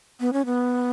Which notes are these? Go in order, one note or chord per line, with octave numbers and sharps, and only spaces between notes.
B3
C#4
B3